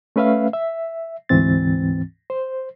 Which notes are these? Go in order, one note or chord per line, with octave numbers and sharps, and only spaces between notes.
A3 C#4 B4 E5 F5
E5
D2 G#2 E3 C4 A6
C5